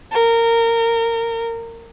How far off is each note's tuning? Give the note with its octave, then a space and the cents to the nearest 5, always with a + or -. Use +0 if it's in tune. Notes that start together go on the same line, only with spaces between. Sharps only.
A#4 -20